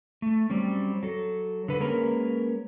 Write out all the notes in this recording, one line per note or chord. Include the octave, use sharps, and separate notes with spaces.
A3
F#3 G3 C4 C#4
F#3 A4
D3 B4
G#3 A#3 C#4 A#4 B4